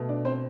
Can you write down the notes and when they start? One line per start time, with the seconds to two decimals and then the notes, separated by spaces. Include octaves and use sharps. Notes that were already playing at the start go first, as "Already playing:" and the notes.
Already playing: B2 A3
0.09 D4 D5
0.25 C4 C5